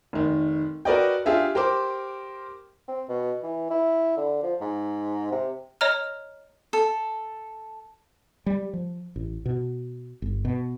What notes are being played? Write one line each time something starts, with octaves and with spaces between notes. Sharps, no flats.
F1 D#3
F#4 A#4 B4 D5 D#5 G5
D4 F4 G4 G#4 E5
G4 A#4 C5 C6 D6
C4
B2
E3
E4
D3
F3
G#2
C3
C#5 D#5 A#5 F6
A4
G3
F3
A1
B2
G1
B2